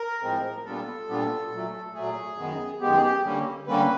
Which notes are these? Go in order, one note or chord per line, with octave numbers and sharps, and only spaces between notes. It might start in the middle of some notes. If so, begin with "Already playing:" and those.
Already playing: A#4
A2 F3 G#3 C4
A#2 G3 B3 D4 F4 A4
A#2 G3 B3 D4 F4
A#2 F#3 A3
A#2 F#3 A3 G#4
F#2 D#3 G#3 B3
F#2 D#3 G#3 B3 G4
G#4
G4
D3 G3 A#3 C#4
D3 G3 A#3 C#4 B4